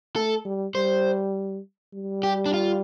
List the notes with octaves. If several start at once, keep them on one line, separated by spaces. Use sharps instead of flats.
A3 A4
G3
G3 C5
G3
G4
D4
F4